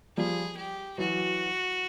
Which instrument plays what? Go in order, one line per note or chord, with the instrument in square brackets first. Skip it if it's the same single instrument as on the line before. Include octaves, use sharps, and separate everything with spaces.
[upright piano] F3 G3 [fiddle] G#4
[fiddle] G4
[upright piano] E3 F#3 [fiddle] F#4